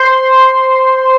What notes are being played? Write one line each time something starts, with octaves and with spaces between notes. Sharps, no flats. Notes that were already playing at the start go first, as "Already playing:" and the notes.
Already playing: C5 C6